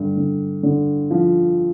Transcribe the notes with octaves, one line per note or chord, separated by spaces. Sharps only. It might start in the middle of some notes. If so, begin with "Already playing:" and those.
Already playing: G2 D3
D3
D3
F3